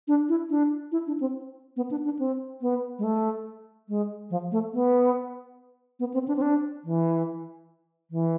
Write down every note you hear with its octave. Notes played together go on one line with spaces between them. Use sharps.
D4
E4
D4
E4
D4
C4
B3
D4
D4
C4
B3
G#3
A3
G#3
F3
A3
B3
B3
C4
D4
C4
D4
E3
E3